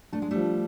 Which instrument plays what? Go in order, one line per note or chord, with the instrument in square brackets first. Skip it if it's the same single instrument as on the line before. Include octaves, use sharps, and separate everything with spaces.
[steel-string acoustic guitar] A3 [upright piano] D4
[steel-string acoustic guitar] G#3
[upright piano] F3 [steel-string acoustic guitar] G3 A3